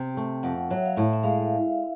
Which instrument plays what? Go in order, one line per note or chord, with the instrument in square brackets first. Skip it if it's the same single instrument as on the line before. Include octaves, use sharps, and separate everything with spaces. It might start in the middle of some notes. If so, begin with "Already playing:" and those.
Already playing: [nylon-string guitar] C3 [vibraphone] G5
[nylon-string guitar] A3
[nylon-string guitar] F2 [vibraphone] F#5
[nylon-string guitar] F#3 [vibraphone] E5
[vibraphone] F5
[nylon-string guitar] A2 [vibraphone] E5
[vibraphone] E5
[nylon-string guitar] G#3 [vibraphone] F5